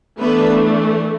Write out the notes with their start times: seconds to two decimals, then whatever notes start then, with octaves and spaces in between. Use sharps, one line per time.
0.19 E3 A3 B3 D4 B4